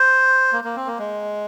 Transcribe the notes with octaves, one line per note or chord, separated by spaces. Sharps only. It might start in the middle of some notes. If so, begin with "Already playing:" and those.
Already playing: C5
A#3
A#3
C4
A#3
G#3